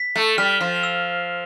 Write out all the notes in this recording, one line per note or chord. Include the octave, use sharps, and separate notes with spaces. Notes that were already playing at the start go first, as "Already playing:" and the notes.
Already playing: B6
A3
G3 F6
F3
E6